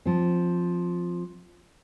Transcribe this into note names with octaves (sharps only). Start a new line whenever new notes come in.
F3 C4